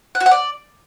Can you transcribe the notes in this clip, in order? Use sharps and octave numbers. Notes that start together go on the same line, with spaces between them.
F#5
F#4
F#5
D5